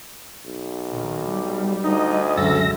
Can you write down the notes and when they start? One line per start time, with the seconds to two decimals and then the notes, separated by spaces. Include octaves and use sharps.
0.45 B1
0.90 A#1 D#3
1.29 G3
1.84 D2 D#4 D#5
2.37 C#2 F#2 D3 F#3 C#4 A4 E5 A#6